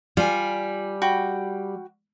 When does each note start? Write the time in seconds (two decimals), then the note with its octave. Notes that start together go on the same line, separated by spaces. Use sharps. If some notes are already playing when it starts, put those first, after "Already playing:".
0.17 G3 F4 G#5
1.02 F#4 G5 B5